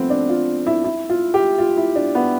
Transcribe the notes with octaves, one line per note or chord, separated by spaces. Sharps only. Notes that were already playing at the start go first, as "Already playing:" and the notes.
Already playing: F3 A3 B3 C4
D4
F4
E4
E4
F4
G4
F4
E4
D4
B3